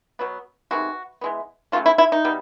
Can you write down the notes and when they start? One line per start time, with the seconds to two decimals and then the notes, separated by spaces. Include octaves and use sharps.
0.19 B2 F#3 B3
0.71 C3 D#3 G#3 B3 F#4
1.21 E3 G#3 B3
1.72 C#3 F#3 A3 F4
1.86 E4
1.98 E4
2.12 D#4
2.25 B2 G3 B3